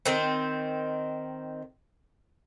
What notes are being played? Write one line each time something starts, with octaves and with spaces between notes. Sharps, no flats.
D#3 C4